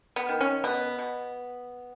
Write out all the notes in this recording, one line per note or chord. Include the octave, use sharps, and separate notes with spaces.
B3
D#3
C#4
B2 B3
B2